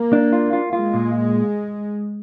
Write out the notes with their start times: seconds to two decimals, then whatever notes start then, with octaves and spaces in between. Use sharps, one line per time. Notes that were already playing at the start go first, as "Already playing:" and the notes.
Already playing: A#3
0.13 D4
0.33 F4
0.53 F4
0.73 G#3 F4
0.94 A#2